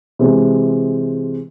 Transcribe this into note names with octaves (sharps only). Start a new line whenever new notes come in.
C3 E3 G#3